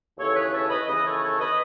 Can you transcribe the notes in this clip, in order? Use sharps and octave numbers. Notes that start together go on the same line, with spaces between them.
D#2 C#3 E3 A4 C#5
G#4 B4
A4 C#5
B4 D#5
D#2 C#3 E3 B4 D#5
A4 C#5
A4 C#5
B4 D#5